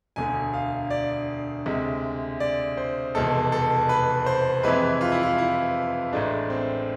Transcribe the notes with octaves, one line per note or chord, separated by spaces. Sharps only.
E1 D2 D3 G#5
F5
D5
D2 C3 G#3
D5
C5
F1 E2 B2 G#3 A4
A4
B4
C5
F2 C3 E3 G#3 B4
F4
E4
F4
E4
A1 A2 G#3 D4
C4